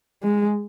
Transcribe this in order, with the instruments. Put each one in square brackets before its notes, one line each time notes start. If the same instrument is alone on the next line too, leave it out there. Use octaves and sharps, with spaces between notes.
[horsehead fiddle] G#3